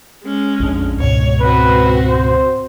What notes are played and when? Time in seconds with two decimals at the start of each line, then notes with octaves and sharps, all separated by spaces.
0.23 G#3 C#4
0.60 A#1 F2 D4
0.99 C#2 G#2 B2 C#5
1.40 C4 F#4 B4
2.08 C5